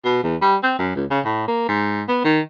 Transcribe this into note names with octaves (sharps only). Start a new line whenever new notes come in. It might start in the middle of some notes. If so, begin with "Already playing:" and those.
B2
E2
G3
C4
F#2
C#2
C#3
A2
A#3
G#2
B3
D#3